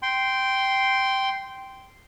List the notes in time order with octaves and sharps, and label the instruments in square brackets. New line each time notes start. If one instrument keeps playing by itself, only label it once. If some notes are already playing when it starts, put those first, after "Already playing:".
[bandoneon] G5 C6